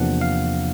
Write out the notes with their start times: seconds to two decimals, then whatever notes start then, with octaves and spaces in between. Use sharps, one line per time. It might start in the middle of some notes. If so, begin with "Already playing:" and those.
Already playing: E2 C3 F3 A#3 D4 F#5
0.21 F5